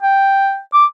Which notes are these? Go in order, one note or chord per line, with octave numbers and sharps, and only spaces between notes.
G5
D6